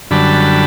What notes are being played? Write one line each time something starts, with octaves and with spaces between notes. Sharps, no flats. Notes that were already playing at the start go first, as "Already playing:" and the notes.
F#2 D3 G3 A5 B5